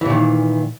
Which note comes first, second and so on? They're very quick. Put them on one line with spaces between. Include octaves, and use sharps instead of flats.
E3 A#2 D#3